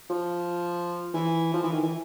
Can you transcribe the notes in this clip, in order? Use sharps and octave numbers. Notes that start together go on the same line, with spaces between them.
F3
E3
F3
E3
D#3
E3